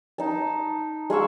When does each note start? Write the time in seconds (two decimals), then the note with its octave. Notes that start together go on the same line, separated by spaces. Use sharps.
0.18 D#4 A5
1.10 G#3 F5 C#6 E6